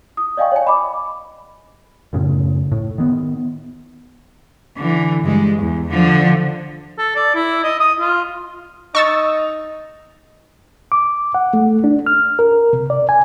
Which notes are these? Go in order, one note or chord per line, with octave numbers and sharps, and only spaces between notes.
D#6
D5 D#5 F5 G5 G#5 C#6
C#5 G#5
D#5 B5 D6
F#2 A2 C#3
A2
D#3 B3
D3 E3
G2 G#3
E2
D3 F3
A4
D5
E4
D#5
D#6
F4
D#4 D#5 C#6 E6 A6
D6
F#5
A3
D4
F6
A#4
C3
D5
G#5